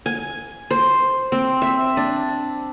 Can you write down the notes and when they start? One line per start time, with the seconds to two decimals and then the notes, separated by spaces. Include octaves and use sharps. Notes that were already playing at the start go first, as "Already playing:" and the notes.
0.06 G#5
0.71 C5
1.32 C4
1.62 E5
1.97 D4